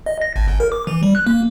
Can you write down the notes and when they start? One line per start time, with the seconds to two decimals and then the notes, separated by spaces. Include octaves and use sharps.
0.06 D#5
0.21 A#6
0.36 G#1
0.48 G1
0.60 A#4
0.72 D6
0.87 E3
1.03 G3
1.15 F#6
1.27 A#3